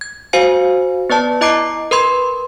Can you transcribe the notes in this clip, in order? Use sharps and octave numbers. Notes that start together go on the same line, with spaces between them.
G#6
F#4 C5 F5 G#5 C#7
B3 B4 D5 A5
E4 D#5 A#5 D6 C7 D7
A#4 B4 B5 C6 G#6